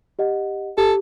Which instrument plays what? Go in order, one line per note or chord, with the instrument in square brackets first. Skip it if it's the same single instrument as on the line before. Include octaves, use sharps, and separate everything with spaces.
[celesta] G4 D#5 F#5
[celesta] G4 [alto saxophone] A4